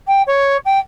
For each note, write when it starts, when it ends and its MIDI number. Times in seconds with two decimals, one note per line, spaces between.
0.07 0.22 79
0.27 0.57 73
0.65 0.78 79